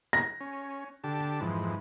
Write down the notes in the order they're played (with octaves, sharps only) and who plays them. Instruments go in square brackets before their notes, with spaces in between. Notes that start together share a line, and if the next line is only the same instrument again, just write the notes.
[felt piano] A#6
[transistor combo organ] C#4
D3 G4 A5
F2 G#2 E3